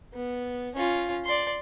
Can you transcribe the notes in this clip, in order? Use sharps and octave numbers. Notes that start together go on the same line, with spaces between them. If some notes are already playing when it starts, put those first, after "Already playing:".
B3
C#4 F4
D5 C6